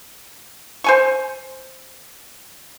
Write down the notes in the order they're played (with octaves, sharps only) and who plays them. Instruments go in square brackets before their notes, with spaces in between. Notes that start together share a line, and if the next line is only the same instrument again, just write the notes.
[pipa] C5 G#5 C#6